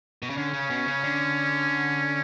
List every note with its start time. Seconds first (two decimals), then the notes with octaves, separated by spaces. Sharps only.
0.22 B2
0.30 C#3
0.37 D3 C#4
0.53 C#3
0.70 B2
0.88 C#3
1.04 D3